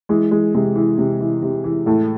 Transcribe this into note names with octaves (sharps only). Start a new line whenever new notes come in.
E3 G#3
E3 G#3
C3 G#3
E3
C3
E3
C3
E3
A2 A3